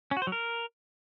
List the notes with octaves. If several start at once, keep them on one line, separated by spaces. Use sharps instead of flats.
C#4
F#4
C5
F#3
A#4